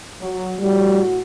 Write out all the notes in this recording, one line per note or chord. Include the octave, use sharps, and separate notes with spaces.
F#3
A2 G3 F#4